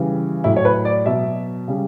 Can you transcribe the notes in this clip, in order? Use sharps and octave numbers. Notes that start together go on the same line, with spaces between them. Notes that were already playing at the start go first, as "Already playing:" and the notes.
Already playing: C#3 E3 G3
A2 F#3 E4
C#5
B4
D5
B2 F#3 E5
C#3 G3